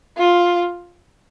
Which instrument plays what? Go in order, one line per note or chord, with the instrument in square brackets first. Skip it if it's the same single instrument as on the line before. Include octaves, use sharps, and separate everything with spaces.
[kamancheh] F4